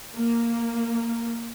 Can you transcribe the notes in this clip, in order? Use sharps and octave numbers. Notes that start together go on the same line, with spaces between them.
A#3